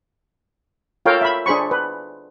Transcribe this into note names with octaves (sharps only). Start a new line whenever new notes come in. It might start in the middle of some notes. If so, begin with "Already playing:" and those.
F4 A4 A#4 C#5 F5 G5
E5 B5
D4 G#4 C5 B5 C#6
B4